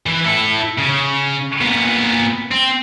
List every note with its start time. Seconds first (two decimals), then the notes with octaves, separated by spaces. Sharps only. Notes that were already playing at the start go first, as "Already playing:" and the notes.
0.06 E3 B4
0.25 E4 A4
0.78 C#3
1.61 A#2 B3
2.51 C4